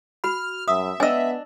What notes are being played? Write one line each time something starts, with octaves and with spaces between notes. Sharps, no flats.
F#4 B5 F6
F#2 E5 D#6
B3 D4 D#5 G#5 E6